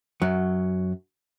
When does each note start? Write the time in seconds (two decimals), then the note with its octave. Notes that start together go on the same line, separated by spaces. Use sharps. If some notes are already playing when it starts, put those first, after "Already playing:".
0.22 F#2 F#3